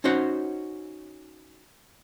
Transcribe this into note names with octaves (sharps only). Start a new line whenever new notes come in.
C#4 D#4 F#4 C5 C#5 F#5